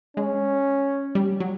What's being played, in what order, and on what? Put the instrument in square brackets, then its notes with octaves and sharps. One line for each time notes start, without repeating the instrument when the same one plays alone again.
[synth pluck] G#3 [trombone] C#4
[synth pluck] G3
F#3